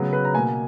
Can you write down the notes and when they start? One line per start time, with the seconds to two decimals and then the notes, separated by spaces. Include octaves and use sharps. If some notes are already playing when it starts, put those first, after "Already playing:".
Already playing: C#3 F#3 B3
0.13 B4
0.25 A#5
0.34 A#3 G#5
0.38 B2